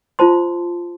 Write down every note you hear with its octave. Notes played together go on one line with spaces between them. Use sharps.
F4 C5 A5 C6